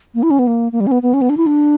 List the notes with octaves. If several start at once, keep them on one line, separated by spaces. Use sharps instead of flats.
A#3
E4
C#4
B3
A#3
A#3
G3
C#4
B3
B3
C#4
B3
D4
E4
D4